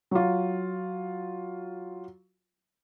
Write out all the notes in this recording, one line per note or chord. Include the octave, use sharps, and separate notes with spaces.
F#3 F4